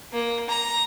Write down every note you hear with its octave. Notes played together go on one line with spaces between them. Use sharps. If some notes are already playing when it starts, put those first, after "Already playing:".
A#3
A#5